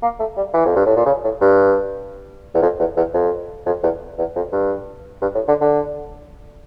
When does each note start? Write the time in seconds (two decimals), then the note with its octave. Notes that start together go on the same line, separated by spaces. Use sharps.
0.02 A#3
0.20 A3
0.37 G3
0.54 E3
0.66 F2
0.76 G2
0.86 A2
0.97 A#2
1.06 C#3
1.24 A2
1.41 G2
2.54 E2
2.62 F2
2.79 E2
2.97 E2
3.14 F2
3.66 F2
3.83 E2
4.18 E2
4.35 F2
4.52 G2
5.21 G2
5.35 A2
5.48 D3
5.61 D3